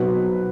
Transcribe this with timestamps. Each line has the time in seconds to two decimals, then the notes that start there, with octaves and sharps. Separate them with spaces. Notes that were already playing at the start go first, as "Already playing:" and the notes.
Already playing: B2 F#3 C4 D#4 B4